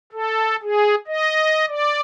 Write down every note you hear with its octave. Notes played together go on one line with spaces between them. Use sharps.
A4
G#4
D#5
D5